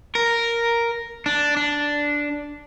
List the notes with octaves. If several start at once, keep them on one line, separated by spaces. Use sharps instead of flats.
A#4
D4
D4